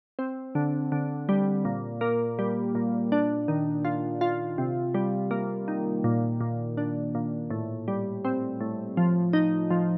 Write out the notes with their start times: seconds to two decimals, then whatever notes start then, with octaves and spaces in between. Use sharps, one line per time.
0.19 C4
0.55 D3
0.92 D3
1.29 G3
1.65 A#2
2.01 A#3
2.39 G3
2.75 A#2
3.12 D4
3.48 D#3
3.85 F4
4.21 F4
4.58 C3
4.94 G3
5.31 A#3
5.68 D#3
6.04 A#2
6.41 A#2
6.77 D4
7.15 A#2
7.51 A2
7.88 G3
8.25 C4
8.61 A2
8.97 F3
9.33 D#4
9.70 F3